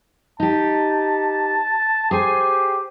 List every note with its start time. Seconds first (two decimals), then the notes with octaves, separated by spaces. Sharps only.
0.40 D#4 G4 A5
2.11 G4 G#4 C5 G#5